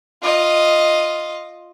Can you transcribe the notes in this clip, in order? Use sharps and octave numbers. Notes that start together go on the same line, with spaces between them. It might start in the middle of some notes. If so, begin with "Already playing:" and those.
F4 D#5